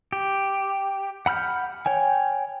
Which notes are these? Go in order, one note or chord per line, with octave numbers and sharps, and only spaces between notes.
G4
F#5 B5 F6 G6
C#5 G5 G#5